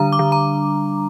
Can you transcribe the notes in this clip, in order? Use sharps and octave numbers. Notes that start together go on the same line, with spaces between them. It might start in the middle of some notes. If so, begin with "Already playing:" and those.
Already playing: D3 G3 D4 A#5
D6
D3
A#5